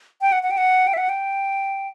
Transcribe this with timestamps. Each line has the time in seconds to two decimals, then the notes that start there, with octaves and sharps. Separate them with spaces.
0.21 G5
0.32 F#5
0.43 F#5
0.51 G5
0.57 F#5
0.87 G5
0.94 E5
0.97 F#5
1.09 G5